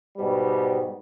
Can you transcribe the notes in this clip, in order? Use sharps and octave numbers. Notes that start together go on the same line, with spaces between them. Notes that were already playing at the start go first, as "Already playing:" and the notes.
G#2 B2 G3